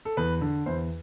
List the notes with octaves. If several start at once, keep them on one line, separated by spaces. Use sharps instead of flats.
A4
E2 B4
D3
E2 C5